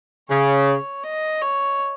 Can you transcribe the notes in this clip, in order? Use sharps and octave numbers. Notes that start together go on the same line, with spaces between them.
C#3 C#5
D#5
C#5